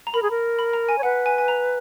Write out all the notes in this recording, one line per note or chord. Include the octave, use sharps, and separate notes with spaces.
A#5
A#4 B5
G#4
A#4
B5
A#5
G#5
C#5
B4 F#5
G#5
G#5
A#5